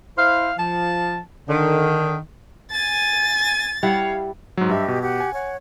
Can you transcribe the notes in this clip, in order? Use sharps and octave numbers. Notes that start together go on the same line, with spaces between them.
E4 C5 F5
F3 A5
D3 D#3
G#5 A6
G3 E4 C#5 F5 F#5
G#2 F#3
G2 G4 D#5 E5
B2
G4 F#5
G#5
C#5 F#5